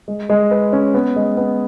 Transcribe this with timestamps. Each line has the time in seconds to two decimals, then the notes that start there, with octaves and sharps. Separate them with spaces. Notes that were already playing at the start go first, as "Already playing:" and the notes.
0.08 G#3
0.30 G#3
0.51 B4
0.73 C#4
0.94 B3
1.16 G#3
1.37 B3